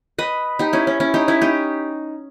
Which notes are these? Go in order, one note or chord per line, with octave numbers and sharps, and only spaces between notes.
B4 D#5
D#4 G4
C#4 E4
C#4
C#4 E4
D#4 G4
C#4 E4
D#4 G4